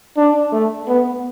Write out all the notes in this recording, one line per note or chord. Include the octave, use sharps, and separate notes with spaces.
D4
A3
B3